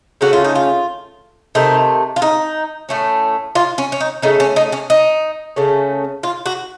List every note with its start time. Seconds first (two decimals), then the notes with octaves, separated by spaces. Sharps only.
0.21 C#3 A3 C#4 F#4
0.33 F4
0.44 D#4
0.55 F4
1.55 C3 D#3 A3 D#4
2.16 F4
2.22 D#4
2.89 A2 A3 C#4
3.55 F4
3.78 C#4
3.92 C#4
4.00 D#4
4.22 C#3 A3 C#4 D#4
4.40 C#4
4.56 D#4
4.72 C#4
4.90 D#4
5.56 C#3 A3 C#4
6.23 F4
6.46 F#4